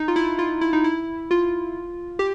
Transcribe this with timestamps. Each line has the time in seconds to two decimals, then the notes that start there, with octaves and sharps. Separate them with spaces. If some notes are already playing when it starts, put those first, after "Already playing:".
Already playing: D#4
0.08 F4
0.16 E4
0.39 F4
0.61 E4
0.73 D#4
0.84 E4
1.31 F4
2.19 G4